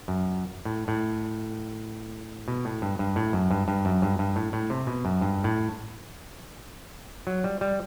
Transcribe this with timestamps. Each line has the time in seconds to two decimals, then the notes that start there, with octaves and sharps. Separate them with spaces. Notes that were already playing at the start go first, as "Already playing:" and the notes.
0.08 F#2
0.65 A2
0.88 A2
2.48 B2
2.65 A2
2.82 G2
2.99 G2
3.16 A2
3.33 F#2
3.51 G2
3.68 G2
3.85 F#2
4.02 G2
4.19 G2
4.36 A2
4.53 A2
4.70 C3
4.87 B2
5.05 F#2
5.21 G2
5.44 A2
7.27 F#3
7.44 G3
7.61 G3